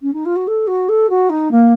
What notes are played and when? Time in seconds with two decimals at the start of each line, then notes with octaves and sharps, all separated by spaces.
0.02 C#4
0.13 D#4
0.25 F4
0.35 F#4
0.47 A4
0.67 F#4
0.88 A4
1.09 F#4
1.29 D#4
1.51 A#3